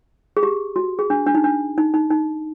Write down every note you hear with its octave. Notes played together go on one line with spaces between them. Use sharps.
G#4
G4
F#4
G#4
D4
D4
D#4
D4
D#4
D#4
D#4